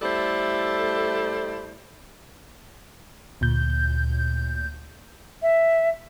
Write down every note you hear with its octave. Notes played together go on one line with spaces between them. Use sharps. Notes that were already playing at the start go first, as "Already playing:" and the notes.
G3 A3 E4 A4 C5 D5
D2 A#2 G6
E5